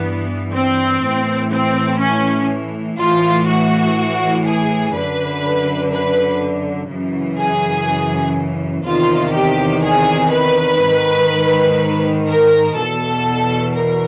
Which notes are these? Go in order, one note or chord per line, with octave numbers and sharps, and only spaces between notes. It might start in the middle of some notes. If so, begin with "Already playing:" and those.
Already playing: G2 E3 B3
C4
A2 E3
C4
C#4
A2 E3 F4
F#4
G#4
F#2 D3 B4
B4
F#2 C#3 E3
G#4
E2 C3 D#3 F4
G4
G#4
B4
G#2 D#3
A#4
E2 B2 A4
A#4